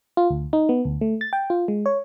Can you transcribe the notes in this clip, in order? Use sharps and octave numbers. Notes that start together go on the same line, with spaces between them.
F4
D2
D#4
B3
D2
A3
A6
G5
F4
G#3
C#5